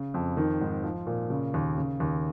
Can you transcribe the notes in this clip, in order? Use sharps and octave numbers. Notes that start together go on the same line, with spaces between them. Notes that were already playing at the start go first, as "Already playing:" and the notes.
Already playing: C#3
F2
D#3
G#2
F3
A#2
C#3
D#2
C#3
D#2